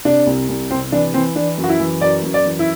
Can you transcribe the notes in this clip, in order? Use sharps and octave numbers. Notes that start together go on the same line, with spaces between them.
C3 D4
C2
C2
C3 C4
E3 D4
E3 C4
E3 D4
F#2
F#4
E4
E3
F#2 D5
F#2
D5
E3
E4